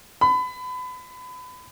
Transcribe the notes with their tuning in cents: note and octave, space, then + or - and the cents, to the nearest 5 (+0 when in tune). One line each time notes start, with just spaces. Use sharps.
B5 +30